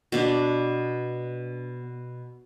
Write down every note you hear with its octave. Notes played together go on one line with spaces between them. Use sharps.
B2 B3 D4